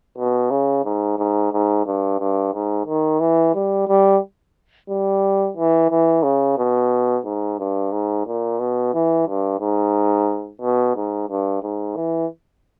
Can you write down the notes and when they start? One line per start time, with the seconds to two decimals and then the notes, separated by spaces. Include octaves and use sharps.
0.18 B2
0.51 C#3
0.84 G#2
1.18 G#2
1.52 G#2
1.86 G2
2.20 G2
2.54 G#2
2.86 D#3
3.20 E3
3.55 G3
3.88 G3
4.89 G3
5.57 E3
5.90 E3
6.23 C#3
6.58 B2
7.25 G#2
7.59 G2
7.92 G#2
8.26 A#2
8.59 B2
8.94 E3
9.27 G2
9.60 G#2
10.61 B2
10.96 G#2
11.29 G2
11.63 G#2
11.96 E3